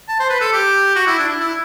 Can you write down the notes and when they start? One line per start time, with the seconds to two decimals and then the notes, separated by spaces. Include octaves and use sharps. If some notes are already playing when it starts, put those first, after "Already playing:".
0.09 A5
0.20 C5
0.30 B4
0.41 A4
0.53 G4
0.96 F#4
1.07 E4
1.18 D4
1.29 E4
1.41 E4